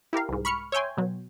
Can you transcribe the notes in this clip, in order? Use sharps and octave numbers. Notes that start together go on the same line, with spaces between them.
E4 G4 A#4 F5
C2 G#2
B5 C#6 F6 C#7
C#5 E5 G5 G#5 C6
B2 F#3